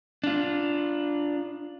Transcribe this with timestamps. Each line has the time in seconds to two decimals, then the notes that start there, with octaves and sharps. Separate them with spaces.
0.24 D4 F4